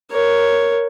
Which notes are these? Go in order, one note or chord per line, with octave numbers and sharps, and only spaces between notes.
A#4 C#5